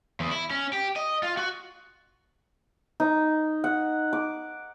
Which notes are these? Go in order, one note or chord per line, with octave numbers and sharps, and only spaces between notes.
E2
E4
C#4
G4
D#5
F4
F#4
D#4
F#5
D6